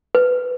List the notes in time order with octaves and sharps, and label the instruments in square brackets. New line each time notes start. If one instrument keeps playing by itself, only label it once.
[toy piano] B4